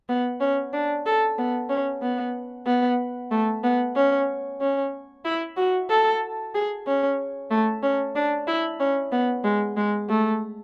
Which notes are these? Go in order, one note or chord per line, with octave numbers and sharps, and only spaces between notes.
B3
C#4
D4
A4
B3
C#4
B3
B3
A3
B3
C#4
C#4
E4
F#4
A4
G#4
C#4
A3
C#4
D4
E4
C#4
B3
G#3
G#3
A3